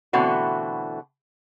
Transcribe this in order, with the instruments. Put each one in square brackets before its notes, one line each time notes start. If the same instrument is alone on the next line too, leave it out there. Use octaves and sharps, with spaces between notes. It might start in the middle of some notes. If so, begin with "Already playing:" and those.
[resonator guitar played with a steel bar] B2 D3 E3 A3 C4 F#4